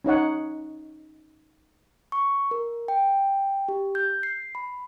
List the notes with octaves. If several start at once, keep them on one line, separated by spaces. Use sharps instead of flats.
C#4 D#4 C#5 F#5
C#6
A#4
G5
G4
G6
C7
B5